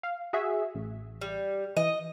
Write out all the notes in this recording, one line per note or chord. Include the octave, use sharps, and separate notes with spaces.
F5
F#4 G#4 E5
A1
G3
E3 D#5